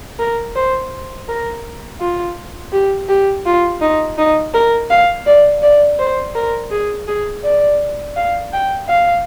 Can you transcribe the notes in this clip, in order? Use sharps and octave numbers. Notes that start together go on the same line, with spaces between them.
A#4
C5
A#4
F4
G4
G4
F4
D#4
D#4
A#4
F5
D5
D5
C5
A#4
G#4
G#4
D5
F5
G5
F5